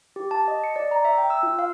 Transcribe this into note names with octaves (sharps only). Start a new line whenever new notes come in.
G4
A5
D#5
C#7
D5
A#5
E5
G5
E6
F4
F5